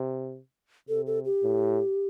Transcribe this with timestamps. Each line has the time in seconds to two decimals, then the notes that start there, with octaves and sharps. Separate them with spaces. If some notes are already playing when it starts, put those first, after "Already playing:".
Already playing: C3
0.89 C3 A4
1.07 A4
1.25 G4
1.43 A2